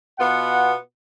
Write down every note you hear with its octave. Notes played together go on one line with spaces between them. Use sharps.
B2 B3 F4 F#5